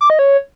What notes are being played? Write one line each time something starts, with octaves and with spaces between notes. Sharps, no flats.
D6
D#5
C#5